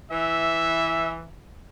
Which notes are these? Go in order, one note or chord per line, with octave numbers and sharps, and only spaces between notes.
E3 E5